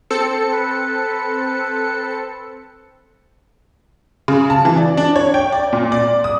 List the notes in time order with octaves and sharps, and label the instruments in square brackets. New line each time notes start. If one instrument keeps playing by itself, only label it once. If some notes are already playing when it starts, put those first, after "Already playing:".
[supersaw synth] C4 A4 C#7
[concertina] B4
[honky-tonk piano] C#3
A5
E3
D5
D4
C#5
G5
D5
A#2
D5
D#6